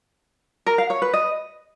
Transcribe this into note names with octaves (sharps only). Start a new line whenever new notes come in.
A#4
F5
C#5
B4
D#5